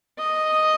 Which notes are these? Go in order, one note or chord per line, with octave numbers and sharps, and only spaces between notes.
D#5